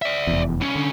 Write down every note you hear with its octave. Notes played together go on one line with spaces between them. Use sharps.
D5 E5
F1 E2
C2 C#4
D3